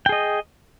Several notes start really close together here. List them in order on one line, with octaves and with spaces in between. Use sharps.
G5 G#4 D#5